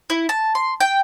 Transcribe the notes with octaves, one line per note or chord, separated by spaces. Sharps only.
E4
A5
C6
G5